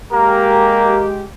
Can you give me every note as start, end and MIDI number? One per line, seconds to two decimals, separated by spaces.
0.13 1.23 56
0.13 1.03 58
0.13 1.23 67
0.13 1.03 70